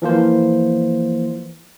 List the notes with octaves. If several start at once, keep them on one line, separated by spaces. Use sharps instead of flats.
E3 F3 A#3 C5